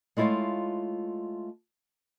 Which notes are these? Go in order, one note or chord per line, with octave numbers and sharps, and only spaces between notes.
G#3 A3 E4 F4 C#5 F5